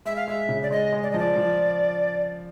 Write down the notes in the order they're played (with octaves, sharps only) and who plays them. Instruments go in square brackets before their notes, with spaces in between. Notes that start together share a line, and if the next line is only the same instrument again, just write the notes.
[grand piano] G#3 [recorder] E5
[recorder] F5
[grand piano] G#3 [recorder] E5
[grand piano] C#3
[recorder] D5
[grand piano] G#3 [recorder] D#5
[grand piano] G#3
[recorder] D5
D#5
[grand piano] F3 [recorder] D5
[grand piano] F3